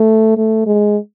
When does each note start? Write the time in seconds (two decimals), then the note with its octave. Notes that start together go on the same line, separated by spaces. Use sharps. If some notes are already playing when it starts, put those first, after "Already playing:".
Already playing: A3
0.37 A3
0.66 G#3